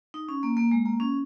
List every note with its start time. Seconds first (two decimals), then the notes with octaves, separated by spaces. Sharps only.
0.14 D#4
0.29 C#4
0.43 A#3
0.57 A#3
0.72 G#3
0.85 A#3
1.00 C#4